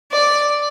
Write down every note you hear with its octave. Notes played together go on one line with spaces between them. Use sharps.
D5